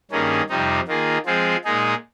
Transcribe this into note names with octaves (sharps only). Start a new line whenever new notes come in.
G2 D#3 A#3 C#4 G#4
F2 C3 G3 C4 D#4
D#3 A#3 F4 G#4
F3 G#3 C4 F4 G#4
A#2 G#3 D#4 G#4